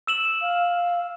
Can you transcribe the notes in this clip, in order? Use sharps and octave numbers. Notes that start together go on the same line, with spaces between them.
E6 E7 F#7
F5